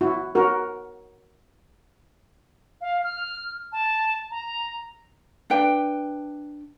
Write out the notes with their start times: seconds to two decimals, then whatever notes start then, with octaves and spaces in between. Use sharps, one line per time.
0.01 E4 F#4
0.35 F#4 A#4
2.81 F5
3.04 F6
3.72 A5
4.31 A#5
5.50 D4 B4 G5